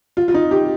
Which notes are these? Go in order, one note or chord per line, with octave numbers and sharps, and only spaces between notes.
F4
F4
D#4
G4